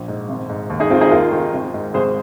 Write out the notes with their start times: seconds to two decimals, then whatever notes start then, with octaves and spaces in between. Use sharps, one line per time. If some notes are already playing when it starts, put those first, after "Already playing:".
Already playing: A#1 A#2
0.08 G#2
0.29 G#1
0.49 G#2
0.70 D#2
0.80 D#4 G#4
0.90 D#3 C4 F4
1.01 D#4 G#4
1.11 D#2 F4 A#4
1.32 D#3
1.53 G#1
1.74 G#2
1.94 G#1 G#4 C5